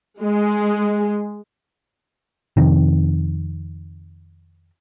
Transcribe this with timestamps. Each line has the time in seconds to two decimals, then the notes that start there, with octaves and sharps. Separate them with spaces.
0.21 G#3
2.57 F2 C3 D#3